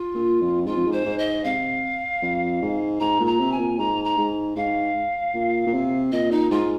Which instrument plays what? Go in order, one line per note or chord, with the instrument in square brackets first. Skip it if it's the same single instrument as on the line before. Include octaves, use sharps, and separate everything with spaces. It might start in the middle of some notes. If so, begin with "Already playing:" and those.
Already playing: [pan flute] F4
[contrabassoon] A#2
F2
[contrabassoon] G#2 [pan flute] F4
[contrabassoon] F2
G#2
[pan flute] C5
[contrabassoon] G#2
[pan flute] D#5
[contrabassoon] C3 [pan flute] F5
[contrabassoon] F2
G#2
[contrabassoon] G#2 [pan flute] A#5
[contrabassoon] A#2
[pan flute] A#5
[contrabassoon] C3
[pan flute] G#5
[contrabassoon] A#2
[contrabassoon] G#2 [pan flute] A#5
[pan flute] A#5
[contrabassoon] G#2
[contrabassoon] G#2 [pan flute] F5
[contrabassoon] A#2
A#2
C3
[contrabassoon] A#2 [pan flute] D#5
[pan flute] D#4
[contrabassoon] G#2 [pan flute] F4